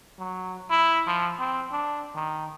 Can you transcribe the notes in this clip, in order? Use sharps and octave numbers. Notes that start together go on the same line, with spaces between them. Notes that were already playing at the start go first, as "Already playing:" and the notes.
F#3
E4
F3
C4
D4
D#3